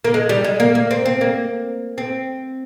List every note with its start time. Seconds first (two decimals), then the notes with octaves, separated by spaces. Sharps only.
0.05 A#3
0.14 G#3
0.29 G3
0.44 G#3
0.60 A#3
0.75 A#3
0.91 C4
1.05 C4
1.21 A#3
1.98 C4